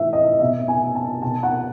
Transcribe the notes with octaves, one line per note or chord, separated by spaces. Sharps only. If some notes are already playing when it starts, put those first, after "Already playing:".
Already playing: A2 E3 E5
D#5
B2 E5
G#5
A5
B2 A5
F#5